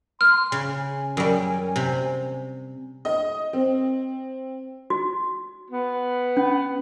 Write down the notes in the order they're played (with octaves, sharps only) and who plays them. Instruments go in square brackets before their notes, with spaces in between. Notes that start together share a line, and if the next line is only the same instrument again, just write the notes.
[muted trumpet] C6 [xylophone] F6
[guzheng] C#3 [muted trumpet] G#5
[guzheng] F#2 G3
C3
[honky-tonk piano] D#5
C4
[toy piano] F#4
[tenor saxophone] B3
[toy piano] C#4